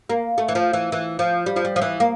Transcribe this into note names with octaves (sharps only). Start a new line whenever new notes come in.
A#3
A3
E3
F3
E3
E3
F3
G3
F3
G3
F3
E3
A#3